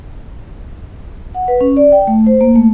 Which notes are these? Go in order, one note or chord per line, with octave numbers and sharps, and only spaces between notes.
F#5
B4
C#4
D5
G5
A3
C5
A#3
A3